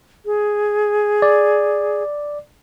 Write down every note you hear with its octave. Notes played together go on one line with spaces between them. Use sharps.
G#4
D5